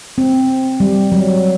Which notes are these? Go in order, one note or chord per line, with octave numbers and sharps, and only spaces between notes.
C4
G3
F#3